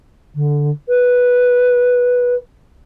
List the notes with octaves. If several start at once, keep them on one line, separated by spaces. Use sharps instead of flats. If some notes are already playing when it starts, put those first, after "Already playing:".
D3
B4